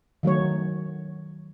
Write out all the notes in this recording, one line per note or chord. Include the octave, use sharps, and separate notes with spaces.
D#3 F#3 A3 C#5